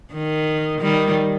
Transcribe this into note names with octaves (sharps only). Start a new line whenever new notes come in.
D#3
D#3 G3